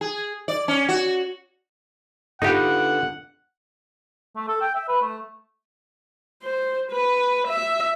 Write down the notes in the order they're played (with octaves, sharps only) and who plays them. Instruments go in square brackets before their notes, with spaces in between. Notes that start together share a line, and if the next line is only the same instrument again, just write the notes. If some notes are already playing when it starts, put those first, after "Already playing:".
[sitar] G#4
D5
C#4
F#4
[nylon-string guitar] D3 B3 F4 [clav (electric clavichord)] D#4 G4 [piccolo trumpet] F#5
[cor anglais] A3
A4
G5
E5
B4
A3
[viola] C5
B4
E5